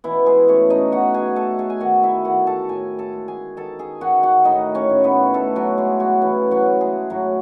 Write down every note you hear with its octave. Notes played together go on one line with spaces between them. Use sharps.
B2 E3 E4
G#3 G#4
A3 C#4 C#5
D#4 D#5
B2 F#4 F#5
G#4 G#5
A3 A4 A5
G#4 G#5
G#5
D#3 F#4 F#5
E4 E5
D#3 F#4 F#5
A4 A5
A2 G#4 G#5
A4 A5
G#3
G#4 G#5
D#3 A4 A5
G#4 G#5
D#3 F#4 F#5
F#4 F#5
A2 D#4 D#5
C#4 C#5
A2
B3 B4
A2 A3 A4
F#3 F#4
G#3 A3 G#4
F#3 F#4
C#3 E3 E4
F#3 F#4
A3
G#3 G#4
A2 F#3 F#4